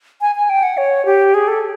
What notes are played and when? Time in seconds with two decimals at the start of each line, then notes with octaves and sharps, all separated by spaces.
0.21 G#5
0.36 G#5
0.49 G5
0.63 F#5
0.77 C#5
1.06 G4
1.34 G#4
1.48 A4